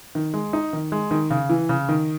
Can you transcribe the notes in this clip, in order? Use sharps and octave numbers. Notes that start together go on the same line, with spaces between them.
D#3
G#3
D#4
D#3
G#3
D#3
C#3
E3
C#3
D#3